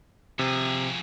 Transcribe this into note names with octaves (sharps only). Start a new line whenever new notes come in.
F2 C3 G#4